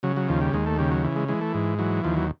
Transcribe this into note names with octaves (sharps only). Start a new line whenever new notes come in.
C#3 F#3
F#3
D#2 F3
G3
D#2 G#3
A3
C#3 G3
F#3
E3
G#3
E3 G#3
A3
G#2
E3 F#3
D#2 F3
F#3